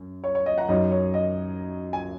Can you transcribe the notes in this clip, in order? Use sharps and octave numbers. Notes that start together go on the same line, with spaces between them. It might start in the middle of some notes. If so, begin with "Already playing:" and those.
Already playing: F#2
C#5
C#5
D#5
F#5 A#5
F#2 F#3 D#4 D#5
C#5
D#5
G#5